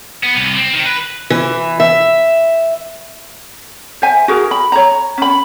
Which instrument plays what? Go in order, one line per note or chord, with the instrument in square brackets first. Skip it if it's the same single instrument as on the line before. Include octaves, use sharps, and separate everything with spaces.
[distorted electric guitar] B3
C2
C4
D#3
B4
[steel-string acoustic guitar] E3
E5
[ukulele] C5 E5 G#5
F#4 G#4 A#4
B5
C#5 A#5
C#4 B5